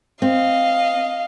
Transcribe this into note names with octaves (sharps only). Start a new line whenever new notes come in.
C4 D#5 F5